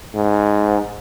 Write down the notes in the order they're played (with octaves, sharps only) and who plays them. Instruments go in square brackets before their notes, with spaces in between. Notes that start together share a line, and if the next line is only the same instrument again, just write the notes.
[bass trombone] G#2